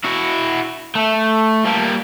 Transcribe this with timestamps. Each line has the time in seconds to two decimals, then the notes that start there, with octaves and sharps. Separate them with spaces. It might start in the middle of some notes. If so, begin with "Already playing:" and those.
0.05 E4 F#4
0.95 A3
1.65 G3 A#3